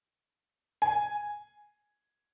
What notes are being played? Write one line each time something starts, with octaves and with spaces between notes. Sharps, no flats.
G#5